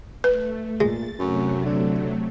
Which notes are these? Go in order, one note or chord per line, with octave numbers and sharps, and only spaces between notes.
A3 B4
A#2 G#3 A6
F#2 C3 F#3 A3
D3